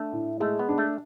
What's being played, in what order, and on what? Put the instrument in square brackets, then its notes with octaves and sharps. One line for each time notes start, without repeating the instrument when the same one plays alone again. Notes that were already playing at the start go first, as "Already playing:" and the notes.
Already playing: [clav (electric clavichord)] A3 [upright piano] D4
[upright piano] A2
[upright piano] G#3 [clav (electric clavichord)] A3
[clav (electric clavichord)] B3
[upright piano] D4
[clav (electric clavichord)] A3